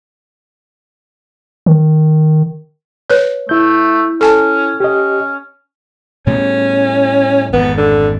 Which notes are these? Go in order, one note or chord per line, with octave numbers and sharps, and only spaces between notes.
D#3
B4 C#5
A3 E4 G6
C#4 A4 G#5 A5
C#4 G4 D#5
A2 G3 B3 C#4
G#1 F2 B3
D3